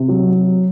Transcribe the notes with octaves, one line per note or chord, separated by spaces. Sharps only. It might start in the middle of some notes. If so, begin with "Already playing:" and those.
Already playing: C3
F#3